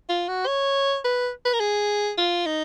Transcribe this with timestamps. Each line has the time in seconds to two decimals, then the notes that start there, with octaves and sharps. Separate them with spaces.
0.09 F4
0.28 F#4
0.47 C#5
1.04 B4
1.45 B4
1.54 A#4
1.60 G#4
2.17 F4
2.46 D#4